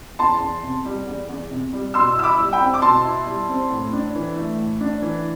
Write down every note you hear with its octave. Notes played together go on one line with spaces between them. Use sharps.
E2 A5 C6
E2
C3
G3
E2
E2
C3
G3
B2 C6 E6
E4 E6
B5 D6
G3
G5 B5
C4
D6
B2 A5 C6
E4
G3
C4
A2
D4
E3
A3
A2
D4
E3